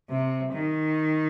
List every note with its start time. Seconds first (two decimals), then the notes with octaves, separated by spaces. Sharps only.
0.10 C3
0.53 D#3